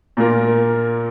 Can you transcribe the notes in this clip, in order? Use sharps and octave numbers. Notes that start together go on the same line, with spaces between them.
A#2 A#3 F4 A#4